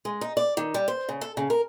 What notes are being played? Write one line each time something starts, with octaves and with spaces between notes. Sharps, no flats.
G#3
D#4
D5
D#3
G3
C5
C#3
A4
C#3
A#4